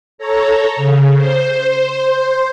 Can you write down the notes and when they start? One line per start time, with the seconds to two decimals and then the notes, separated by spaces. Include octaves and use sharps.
0.18 A4 C#5 A#5
0.76 C#3
1.16 C5